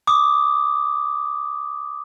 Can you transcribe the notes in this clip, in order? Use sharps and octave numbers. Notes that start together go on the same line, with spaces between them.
D6 D#6